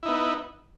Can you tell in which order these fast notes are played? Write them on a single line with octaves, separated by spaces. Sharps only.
E4 D#4 B3